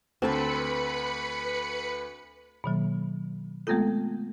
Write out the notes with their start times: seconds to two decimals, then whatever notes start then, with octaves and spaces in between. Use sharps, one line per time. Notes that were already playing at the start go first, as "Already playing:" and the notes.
0.22 D2 C4 A4 B4 C5 B5 C#7
2.64 B2 D#3 F#3 A#3
3.67 G#3 A3 B3 C4 F4 A4